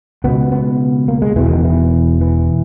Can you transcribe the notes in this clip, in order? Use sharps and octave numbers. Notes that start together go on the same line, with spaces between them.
C#2 B2 B3
B3
A#3
G#3
E1 E2 B2 E3
D#3
E3
E3